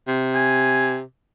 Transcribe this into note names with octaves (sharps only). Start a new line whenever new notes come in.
C3
G#5